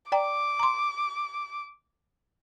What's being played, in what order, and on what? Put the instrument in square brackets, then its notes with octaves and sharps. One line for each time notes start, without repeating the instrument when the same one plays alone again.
[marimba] D5 G5 A#5 [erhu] D6
[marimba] A#5 C6